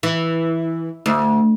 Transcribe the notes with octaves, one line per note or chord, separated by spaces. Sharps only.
E3
D2